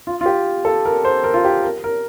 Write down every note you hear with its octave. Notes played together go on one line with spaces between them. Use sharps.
F4
F4
G4
A4
A#4
C5
A#4
F4
G4
A#4
A#4